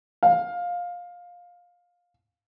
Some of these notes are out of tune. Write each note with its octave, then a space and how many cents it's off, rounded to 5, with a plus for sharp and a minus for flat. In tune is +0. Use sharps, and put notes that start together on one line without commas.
F5 +15